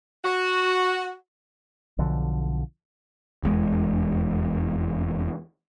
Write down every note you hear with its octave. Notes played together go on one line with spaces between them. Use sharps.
F#4
B1 D3 F3
F1 E2 G#3